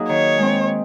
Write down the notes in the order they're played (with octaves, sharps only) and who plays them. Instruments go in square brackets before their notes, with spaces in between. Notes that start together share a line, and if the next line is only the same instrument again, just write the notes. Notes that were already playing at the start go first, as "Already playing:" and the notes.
Already playing: [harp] F#3 A#3 D#4 G#4
[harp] D#3 [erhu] C#5
[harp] G#3 C4